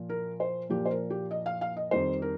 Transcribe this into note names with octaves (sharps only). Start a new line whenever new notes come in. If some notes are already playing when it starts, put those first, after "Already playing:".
Already playing: A#2 F3
A#4
C5
A#2 F3 G4
C5
A#4
G4
D#5
F5
F5
D#5
F2 D#3 G3 C5
A#4